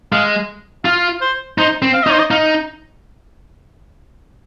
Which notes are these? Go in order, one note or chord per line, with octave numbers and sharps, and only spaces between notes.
G#3 F5
F4 F5
C5
D#4 C5
C4
F5
D#4 D#5
C5
D#5
D#4 F5